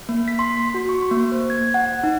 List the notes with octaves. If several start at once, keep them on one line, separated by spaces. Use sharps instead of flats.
A#3
B6
C6
F#4
C#6
A#3
C5
G#6
F#5
D#4